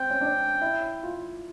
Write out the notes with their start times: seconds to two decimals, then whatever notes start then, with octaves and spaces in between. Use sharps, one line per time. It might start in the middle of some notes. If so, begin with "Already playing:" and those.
Already playing: C4 G5
0.11 C#4
0.21 D4
0.61 E4
1.03 F4